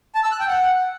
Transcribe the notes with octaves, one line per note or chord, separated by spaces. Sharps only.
A5
E6
F#6
G5
F#5